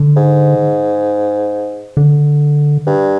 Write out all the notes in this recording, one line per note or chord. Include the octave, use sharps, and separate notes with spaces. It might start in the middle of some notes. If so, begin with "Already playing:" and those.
Already playing: D3
G#2
D3
G2